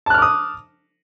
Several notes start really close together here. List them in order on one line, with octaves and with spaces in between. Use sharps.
A5 F#6 F6 D6 D#6